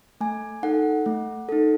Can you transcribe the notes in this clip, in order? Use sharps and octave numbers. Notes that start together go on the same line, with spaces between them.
A3 G#5
D#4 A4 F#5
A3
D#4 A4